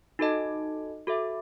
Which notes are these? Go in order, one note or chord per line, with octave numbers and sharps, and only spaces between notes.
D#4 F#4 A4 D#5 A5
F#4 A4 E5